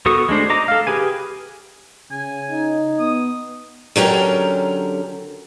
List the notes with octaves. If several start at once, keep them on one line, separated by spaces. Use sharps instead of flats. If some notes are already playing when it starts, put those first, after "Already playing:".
B3 F#4 A4 C#6 D#6
G#3 A3 D4 C5
D#5 A#5 D6
A4 F5
G4 G#4 B4 G#5
C#3 G#5
D#4
B3 D#6
D3 F#3 C#4 G4 A#4